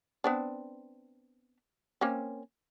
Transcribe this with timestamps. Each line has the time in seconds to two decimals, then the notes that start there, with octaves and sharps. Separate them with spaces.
0.24 B3 C4 D4
2.01 A#3 C4 C#4